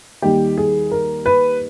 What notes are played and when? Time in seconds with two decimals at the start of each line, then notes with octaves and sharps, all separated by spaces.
0.22 D#2 D#3 G3 G4
0.57 G#4
0.91 A#4
1.26 B4